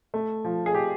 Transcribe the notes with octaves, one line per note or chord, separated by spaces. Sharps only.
A3
F3
G#4
G4